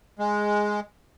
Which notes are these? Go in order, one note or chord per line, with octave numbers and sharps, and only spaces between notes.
G#3